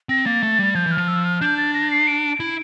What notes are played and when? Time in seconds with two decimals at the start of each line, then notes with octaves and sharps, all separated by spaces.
0.09 C4 A#6
0.26 A#3 A6
0.43 A3
0.59 G3
0.75 F3 G6
0.86 E3
0.91 F6
0.98 F3
1.08 E6
1.25 F6
1.41 D4 G6
1.58 A6
1.74 A#6
1.91 C7
2.07 D7
2.40 E4